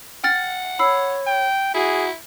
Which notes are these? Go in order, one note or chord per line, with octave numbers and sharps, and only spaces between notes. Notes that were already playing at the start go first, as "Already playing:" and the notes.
F#5 G5 F6 A6
C#5 B5 E6 C7
G5
E4 F#4 G#4